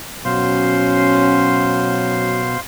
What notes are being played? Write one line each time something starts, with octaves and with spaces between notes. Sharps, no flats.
B2 F#3 C#4 C5 F5 C6